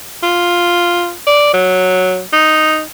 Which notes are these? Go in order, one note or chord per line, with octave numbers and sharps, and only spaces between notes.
F4
D5
F#3
D#4